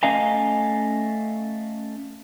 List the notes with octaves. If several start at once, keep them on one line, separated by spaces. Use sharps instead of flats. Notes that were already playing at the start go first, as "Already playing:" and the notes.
A3 C#4 D#5 F5 G#5 A#5